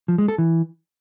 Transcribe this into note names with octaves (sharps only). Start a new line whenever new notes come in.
F3
G#3
A4
E3